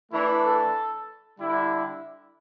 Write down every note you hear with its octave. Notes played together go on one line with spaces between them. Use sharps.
E3 A3 D4 E4
A4
D3 G3 E4